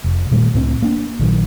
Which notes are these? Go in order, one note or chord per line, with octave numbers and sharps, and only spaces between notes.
F1
A#2 D#3 G3 A3
C#2 A2 C4
A#3 D4
A#1 D#3 F3 F#3